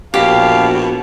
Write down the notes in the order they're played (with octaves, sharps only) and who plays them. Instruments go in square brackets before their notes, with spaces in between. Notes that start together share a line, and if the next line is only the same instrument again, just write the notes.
[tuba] A#1 [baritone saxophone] B2 [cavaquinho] G4 [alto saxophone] F5